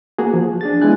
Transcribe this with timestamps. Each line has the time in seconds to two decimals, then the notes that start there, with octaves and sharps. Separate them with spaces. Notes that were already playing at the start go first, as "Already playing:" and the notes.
0.18 A#3 F#4 G#4
0.34 F3
0.61 D4 G#4 A6
0.81 G#3 B3 E4 G#5 F#6